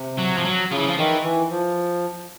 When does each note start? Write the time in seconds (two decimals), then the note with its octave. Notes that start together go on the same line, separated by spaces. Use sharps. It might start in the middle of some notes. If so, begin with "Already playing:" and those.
Already playing: C3
0.18 F#3
0.37 F3
0.45 F#3
0.70 C#3 F3
0.78 E3
0.87 F3
0.98 D#3 E3
1.24 E3
1.50 F3